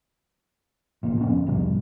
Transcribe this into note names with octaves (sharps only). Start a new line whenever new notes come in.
E1 A1 E2 A#2
G1 F2 B3 C#4
C2 F2 G#2 G3